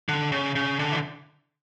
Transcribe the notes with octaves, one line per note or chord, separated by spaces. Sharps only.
D3
C#3
C#3
D3
E3